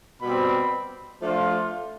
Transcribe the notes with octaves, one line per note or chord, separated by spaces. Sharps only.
B2 G3 C4 B5
F3 A3 D4 F4